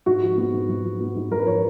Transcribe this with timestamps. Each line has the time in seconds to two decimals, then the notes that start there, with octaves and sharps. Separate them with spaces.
0.06 G#2 F#4
0.23 F3
0.38 B3
0.54 G#2
0.69 G#2
0.84 F3
1.01 B3
1.16 G#2
1.31 G#2 A#4
1.39 B4
1.47 F3 C#5